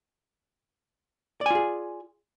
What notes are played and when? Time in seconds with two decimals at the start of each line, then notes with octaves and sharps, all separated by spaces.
1.41 D5
1.46 G#5
1.51 F4
1.55 G#4